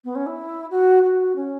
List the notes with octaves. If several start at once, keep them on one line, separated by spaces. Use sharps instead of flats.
B3
C#4
E4
F#4
F#4
C#4